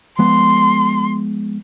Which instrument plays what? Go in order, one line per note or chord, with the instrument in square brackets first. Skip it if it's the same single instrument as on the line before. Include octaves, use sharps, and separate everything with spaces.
[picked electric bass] F3 G#3 B3 [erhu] C6